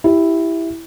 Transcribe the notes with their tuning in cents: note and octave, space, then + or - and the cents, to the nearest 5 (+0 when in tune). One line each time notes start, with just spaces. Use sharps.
E4 +0 G4 +0